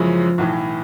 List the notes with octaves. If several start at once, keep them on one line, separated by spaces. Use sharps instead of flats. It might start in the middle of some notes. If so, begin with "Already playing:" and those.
Already playing: F#2 C#3 E3 F3 G#3 C#4
B1 A2 E3